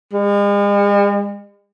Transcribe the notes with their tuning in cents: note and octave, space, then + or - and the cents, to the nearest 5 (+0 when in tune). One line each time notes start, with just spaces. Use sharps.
G#3 -45